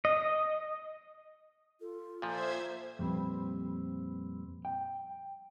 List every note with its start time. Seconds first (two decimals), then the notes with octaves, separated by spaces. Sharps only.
0.05 D#5
1.81 F4 A4
2.22 A#2 F3 C5 E5 G#6
2.99 F2 A#2 G3 C4 B4
4.65 G5